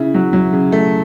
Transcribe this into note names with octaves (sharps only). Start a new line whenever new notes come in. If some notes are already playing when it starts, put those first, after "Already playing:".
Already playing: C#3 E4
F#3
F#3
C#3
A3